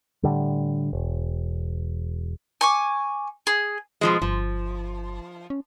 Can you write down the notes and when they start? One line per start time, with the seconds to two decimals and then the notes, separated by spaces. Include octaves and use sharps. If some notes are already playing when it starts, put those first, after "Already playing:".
0.23 A2 D3 G3
0.93 E1
2.61 G#5 C#6 D6
3.47 G#4
4.01 B2 F3 G#3
4.22 G1 F3
5.50 C#4